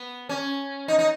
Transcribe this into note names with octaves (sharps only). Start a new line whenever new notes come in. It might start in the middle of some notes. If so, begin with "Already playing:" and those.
Already playing: B3
C#4
D#4
D#4